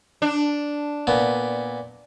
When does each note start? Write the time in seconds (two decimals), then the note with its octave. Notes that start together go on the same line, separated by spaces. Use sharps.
0.22 D4
1.07 A#2 B3